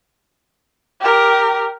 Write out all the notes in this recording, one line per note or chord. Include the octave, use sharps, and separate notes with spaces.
G4 A#4